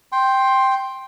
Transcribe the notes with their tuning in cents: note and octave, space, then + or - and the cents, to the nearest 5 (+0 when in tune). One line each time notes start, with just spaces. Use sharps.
G5 +0 C6 +10